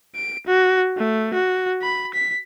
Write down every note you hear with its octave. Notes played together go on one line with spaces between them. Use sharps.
D7
F#4
A3
F#4
B5
B6